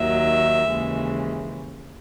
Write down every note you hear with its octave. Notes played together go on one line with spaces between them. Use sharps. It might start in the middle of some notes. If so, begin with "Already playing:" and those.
Already playing: D#2 D#3 F#3 E5
D#2 C#3 E3 G#3